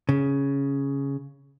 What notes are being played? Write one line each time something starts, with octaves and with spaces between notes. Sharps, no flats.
C#3